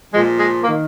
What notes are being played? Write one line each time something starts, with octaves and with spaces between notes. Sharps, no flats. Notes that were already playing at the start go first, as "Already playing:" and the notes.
A#2 F3 G#3
G#3
A#3
D#3